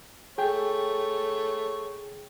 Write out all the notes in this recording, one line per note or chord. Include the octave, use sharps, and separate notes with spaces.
A3 G#4 C#5 G5